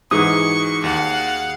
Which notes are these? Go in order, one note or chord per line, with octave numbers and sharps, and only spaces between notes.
G#2 E3 D#4 F#4 G#4 C#6 D#6
D#2 F5 F#5